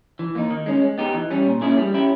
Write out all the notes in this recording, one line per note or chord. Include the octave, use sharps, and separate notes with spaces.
E3
A#3 D#4
D#3
G#3 C#4
G#3
B3 D#4 G4
E3
G3 C#4
A#2
A#3 C#4 E4 G#4
G3
C#4 E4 G4